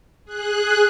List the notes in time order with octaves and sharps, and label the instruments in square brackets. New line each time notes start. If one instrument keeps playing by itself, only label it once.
[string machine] G#4 F#6